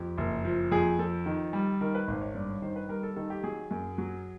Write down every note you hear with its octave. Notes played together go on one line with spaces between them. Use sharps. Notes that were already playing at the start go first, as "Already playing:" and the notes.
Already playing: F2 G4
F#1
F3
F2 G#4
F3 A4
D#3
G3
D#3 A#4
B4
G#1 C5
C#5
G2 D5
C#5
D#3 C5
B4
G3 A#4
A4
D#3 A4
G4
F#3 G#4
F#2
F#3